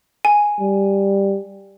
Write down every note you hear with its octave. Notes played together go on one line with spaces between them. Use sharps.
G#5
G3